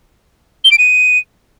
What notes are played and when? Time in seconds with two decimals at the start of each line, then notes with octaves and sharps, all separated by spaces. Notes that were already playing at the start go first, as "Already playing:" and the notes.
0.64 G7
0.71 D7
0.78 D#7